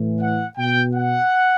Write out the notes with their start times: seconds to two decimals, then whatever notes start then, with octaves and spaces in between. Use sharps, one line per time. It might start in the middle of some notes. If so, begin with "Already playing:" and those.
Already playing: A2 E3
0.21 F#5
0.58 B2 G5
0.95 F#5